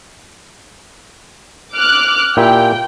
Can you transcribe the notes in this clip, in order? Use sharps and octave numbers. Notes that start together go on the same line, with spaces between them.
D6 F6 F#6
A#2 E4 G4 G5